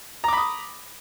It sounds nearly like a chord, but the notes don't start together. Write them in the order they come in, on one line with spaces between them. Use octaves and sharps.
A#5 D6 B5 D#6